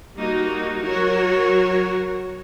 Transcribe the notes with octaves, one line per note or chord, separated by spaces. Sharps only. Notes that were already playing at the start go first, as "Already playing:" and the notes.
G3 A#3 D#4 F#4
F#3 F#4 A#4 C#5